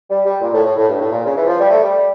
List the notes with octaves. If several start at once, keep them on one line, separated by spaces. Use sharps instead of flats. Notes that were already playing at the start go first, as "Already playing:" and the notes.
G3
G3
A#2
A2
A2
A2
G2
A2
A#2
C#3
E3
F3
G3
A3
G3